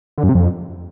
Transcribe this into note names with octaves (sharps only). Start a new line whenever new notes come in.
D3
F#2
C3
F2